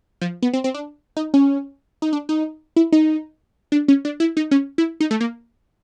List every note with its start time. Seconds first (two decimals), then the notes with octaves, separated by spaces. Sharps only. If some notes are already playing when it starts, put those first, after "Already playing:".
0.21 F3
0.42 B3
0.53 C4
0.64 C4
0.74 D4
1.17 D#4
1.34 C#4
2.02 D#4
2.13 D4
2.29 D#4
2.76 E4
2.92 D#4
3.72 D4
3.88 C#4
4.05 D4
4.20 E4
4.37 D#4
4.51 C#4
4.78 E4
5.00 D#4
5.11 A3
5.21 A#3